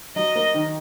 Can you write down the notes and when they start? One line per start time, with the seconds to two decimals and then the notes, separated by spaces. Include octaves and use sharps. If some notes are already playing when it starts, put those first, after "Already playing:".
0.16 F#3 D#5
0.35 A#3
0.55 D#3